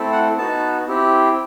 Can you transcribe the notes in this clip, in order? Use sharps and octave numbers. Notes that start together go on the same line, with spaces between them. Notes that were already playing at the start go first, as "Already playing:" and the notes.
Already playing: A3 C4 E4 A4
F#5
B3 D#4 F#4 A5
C4 E4 G4